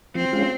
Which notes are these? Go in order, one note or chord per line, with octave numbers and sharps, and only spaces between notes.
F3 C4
G#3 C#4 F4